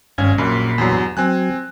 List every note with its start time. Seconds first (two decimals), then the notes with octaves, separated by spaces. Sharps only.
0.18 G#1 G2 C#4 F5 G#6
0.38 A#1 F#2 A#2 B5 C6
0.78 E2 G2 F#3
1.17 F#3 C4 G#5 F#6